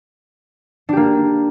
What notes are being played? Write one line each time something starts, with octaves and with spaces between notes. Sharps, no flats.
A#3 D4 G4